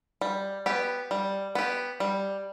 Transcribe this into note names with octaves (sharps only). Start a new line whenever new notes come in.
G3
B3 G4
G3
B3 G4
G3